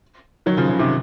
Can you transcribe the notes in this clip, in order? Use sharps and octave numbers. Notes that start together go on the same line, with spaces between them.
D#3 F#3
C#3 F3
C#3
C3 D#3